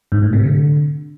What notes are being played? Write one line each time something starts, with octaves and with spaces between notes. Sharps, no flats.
G#2
A2
C3
D3